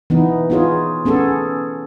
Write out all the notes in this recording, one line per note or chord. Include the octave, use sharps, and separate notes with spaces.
E3 B3 D#4
B3 D#4 F4 G#4 C#5
B3 C#4 G#4 A4